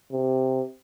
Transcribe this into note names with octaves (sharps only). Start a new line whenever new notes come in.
C3